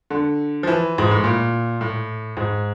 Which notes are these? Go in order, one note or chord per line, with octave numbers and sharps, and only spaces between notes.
D3
F3
E3
G#2
A2
A#2
A2
G#2